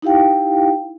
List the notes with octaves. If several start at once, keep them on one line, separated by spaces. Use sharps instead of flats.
D#4 E4 G4 F5 G5